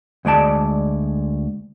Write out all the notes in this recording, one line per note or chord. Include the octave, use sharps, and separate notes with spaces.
D2 G#3 D5 A5